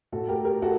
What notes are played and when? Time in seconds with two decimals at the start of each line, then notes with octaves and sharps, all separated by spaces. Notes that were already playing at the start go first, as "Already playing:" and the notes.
0.12 A2 F#4 A4
0.28 G4 A#4
0.45 G4 A#4
0.62 F#4 A4